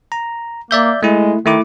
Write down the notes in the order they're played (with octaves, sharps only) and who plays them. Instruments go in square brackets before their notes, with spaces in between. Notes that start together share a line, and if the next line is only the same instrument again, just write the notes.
[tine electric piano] A#5
[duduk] A#3 [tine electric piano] D5 E5 G6
[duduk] G#3 [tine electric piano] A3 E4
[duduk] D#3 [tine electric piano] A3 E4 D6